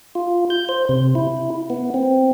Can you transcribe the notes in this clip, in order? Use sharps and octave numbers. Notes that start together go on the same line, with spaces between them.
F4
G6
C5
C3
E4
B3
C4